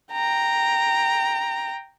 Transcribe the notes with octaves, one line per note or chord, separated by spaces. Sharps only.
G5 A#5